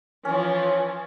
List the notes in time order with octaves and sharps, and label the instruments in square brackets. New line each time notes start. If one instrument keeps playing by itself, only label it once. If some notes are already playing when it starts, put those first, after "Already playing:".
[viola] E3 F3 [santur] C#4 C#5